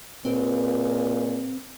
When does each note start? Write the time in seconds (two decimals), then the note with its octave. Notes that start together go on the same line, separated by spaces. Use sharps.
0.25 C#2 A#2 C4